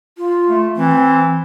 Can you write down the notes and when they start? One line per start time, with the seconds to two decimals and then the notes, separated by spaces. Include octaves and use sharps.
0.18 F4
0.48 A3
0.76 E3 C4